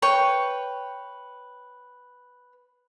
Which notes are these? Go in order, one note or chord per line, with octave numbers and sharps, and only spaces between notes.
B4 C#5 G5